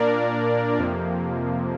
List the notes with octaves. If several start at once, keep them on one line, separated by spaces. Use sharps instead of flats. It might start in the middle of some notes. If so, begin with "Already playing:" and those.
Already playing: A#2 A#3 D4 A#4 D5
F2 C3 F3 A#3